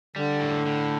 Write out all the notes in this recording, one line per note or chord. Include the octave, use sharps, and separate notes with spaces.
D3 G3
A2
A2